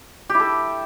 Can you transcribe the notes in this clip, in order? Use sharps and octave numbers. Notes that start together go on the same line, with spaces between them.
G4
E4
A4